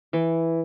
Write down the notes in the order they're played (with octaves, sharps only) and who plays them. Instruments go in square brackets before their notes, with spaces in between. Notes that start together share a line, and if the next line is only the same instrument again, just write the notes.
[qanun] E3